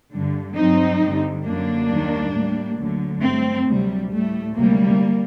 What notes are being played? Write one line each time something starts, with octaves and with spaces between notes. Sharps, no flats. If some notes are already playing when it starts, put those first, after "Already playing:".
G2 D3 G3
G2 F#3 C4 D#4
G2 D3 G3
F#2 D3 F#3 A#3 D4
D#2 D#3 G3
A2 G3
D2 D3 F#3
G2 F#3 A3 C4
D2 C3 F#3 G3
A2 G3 A3
D2 C3 F#3 G3 A#3